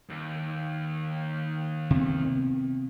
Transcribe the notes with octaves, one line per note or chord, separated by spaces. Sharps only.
D#2
C3 B3